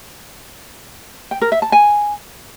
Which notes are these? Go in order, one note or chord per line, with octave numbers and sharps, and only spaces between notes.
G5
A#4
E5
A5
G#5